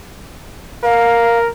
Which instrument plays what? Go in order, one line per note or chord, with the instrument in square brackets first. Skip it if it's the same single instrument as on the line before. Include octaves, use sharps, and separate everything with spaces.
[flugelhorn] A#4 [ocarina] F5